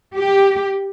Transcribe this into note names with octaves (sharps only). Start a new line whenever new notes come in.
G4